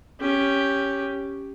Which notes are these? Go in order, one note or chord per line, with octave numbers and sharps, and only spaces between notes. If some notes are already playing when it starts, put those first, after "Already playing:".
C#4 G4